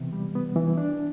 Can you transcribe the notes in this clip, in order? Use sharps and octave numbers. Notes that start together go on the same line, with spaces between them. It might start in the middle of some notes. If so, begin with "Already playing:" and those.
Already playing: C3 E3 B3
G3
B3
E3
D4